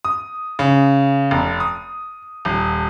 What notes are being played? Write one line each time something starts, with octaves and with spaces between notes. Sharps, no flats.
D#6
C#3
F1
D#6
D#1